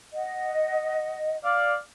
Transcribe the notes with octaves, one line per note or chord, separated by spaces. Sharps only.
D#5 F#5
D5 F5